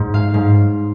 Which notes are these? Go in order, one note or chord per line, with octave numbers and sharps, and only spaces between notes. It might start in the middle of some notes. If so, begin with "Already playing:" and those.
Already playing: G#2
F5
G#2